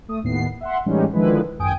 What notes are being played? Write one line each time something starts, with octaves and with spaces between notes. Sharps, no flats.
A3 D#6
D#2 A2 B3 C7
E5 F#5 C6
A2 E3 G3 G#3 C#4 D#4
D3 D#3 F3 G#3 E4 B4
G#1 F#2 G5 G#5 D#6 D7